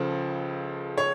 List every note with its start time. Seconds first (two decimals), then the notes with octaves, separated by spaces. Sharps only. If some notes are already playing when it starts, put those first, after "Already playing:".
Already playing: C#2 C#3 F3 A4
0.98 C#5